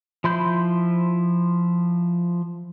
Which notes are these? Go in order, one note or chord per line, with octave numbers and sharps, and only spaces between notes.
F3 E4 B5 C6 G6